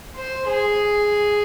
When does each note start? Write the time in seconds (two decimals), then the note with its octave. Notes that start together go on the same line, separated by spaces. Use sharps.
0.16 C5
0.48 G#4